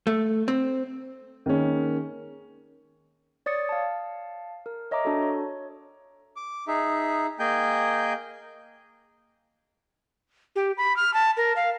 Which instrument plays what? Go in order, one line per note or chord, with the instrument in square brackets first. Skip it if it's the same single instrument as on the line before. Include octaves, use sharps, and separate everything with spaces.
[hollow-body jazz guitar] A3
C4
[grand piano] D#3 G#3 A#3 C#4
[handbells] C#5 D5 D#6 A6 C#7
F5 A5
A#4
C#5 D#5 E5 A#5 D6
D4 F#4 A4
C#5
[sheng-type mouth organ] D6
D#4 G#4 E5
A#3 G#4 D#5 G5 G#5 G6
[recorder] G4
B5
F6
A5
A#4
F5